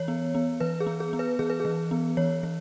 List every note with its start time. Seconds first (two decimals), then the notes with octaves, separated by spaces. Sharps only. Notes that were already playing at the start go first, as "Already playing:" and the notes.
Already playing: E3 C#5
0.08 B3
0.35 B3
0.60 E3 B4
0.80 G#4
0.87 B3
1.00 G#4
1.13 B3
1.19 B4
1.39 E3 G#4
1.50 B4
1.60 E3 G#4
1.91 B3
2.17 E3 C#5
2.43 E3